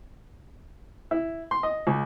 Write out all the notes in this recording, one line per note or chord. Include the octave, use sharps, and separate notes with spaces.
E4
C6
D#5
C#2